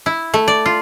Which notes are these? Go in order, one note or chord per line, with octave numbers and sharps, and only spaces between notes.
E4
A3
D5
F4